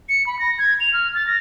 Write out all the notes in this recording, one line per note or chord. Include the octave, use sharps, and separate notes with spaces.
C#7
B5
A#6
G#6
F7
F6
A6
A#6